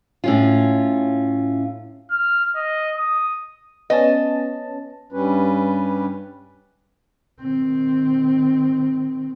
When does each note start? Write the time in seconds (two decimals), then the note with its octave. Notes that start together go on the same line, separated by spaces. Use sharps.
0.24 A2 C#4 F4
2.11 F6
2.56 D#5
2.97 D#6
3.90 B3 C#4 D#5 A5
5.12 G2 G3 C#4 B4
7.42 D#3 C4